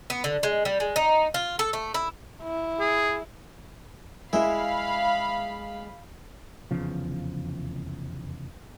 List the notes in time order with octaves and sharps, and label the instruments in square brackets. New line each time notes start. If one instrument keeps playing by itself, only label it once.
[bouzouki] B3
D3
G#3
G3
G#3
D#4
F4
A4
A3
E4
[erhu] E4
[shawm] G#4
[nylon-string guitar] G#3 E5 [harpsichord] E4 [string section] F5 B5
[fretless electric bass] F1 E2 C#3 F3